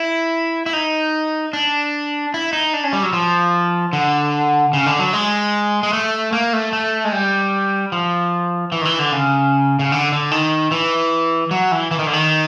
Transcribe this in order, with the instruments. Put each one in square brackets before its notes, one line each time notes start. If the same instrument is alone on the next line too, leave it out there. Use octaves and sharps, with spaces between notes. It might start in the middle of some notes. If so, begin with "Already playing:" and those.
Already playing: [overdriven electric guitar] E4
E4
D#4
D4
E4
D#4
D4
C#4
G3
F#3
F3
D3
C#3
D3
F#3
G#3
G#3
A3
A#3
A3
A3
G#3
G3
F3
E3
D#3
E3
D3
C#3
C#3
D3
D3
D#3
E3
F#3
E3
E3
D#3
D3
D#3